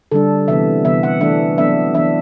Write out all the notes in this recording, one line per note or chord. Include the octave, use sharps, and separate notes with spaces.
D3 G3 D4 A4
C3 E3 B3 E5
C3 E3 B3 E5
F#5
E3 A3 D4 E5
F#3 B3 D4 E5
E3 B3 D4 E5